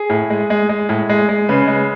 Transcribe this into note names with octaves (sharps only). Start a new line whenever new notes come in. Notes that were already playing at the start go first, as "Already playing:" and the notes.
Already playing: G#4
A2
G#3
G#3
G#3
A2
G#3
G#3
C#3 B4
G#3